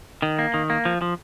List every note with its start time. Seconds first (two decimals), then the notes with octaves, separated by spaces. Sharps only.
0.22 D#3
0.39 A#3
0.54 D#3
0.70 A#3
0.85 F3
1.02 F3